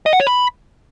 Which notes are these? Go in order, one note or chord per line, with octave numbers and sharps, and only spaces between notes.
D#5
F#5
C#5
B5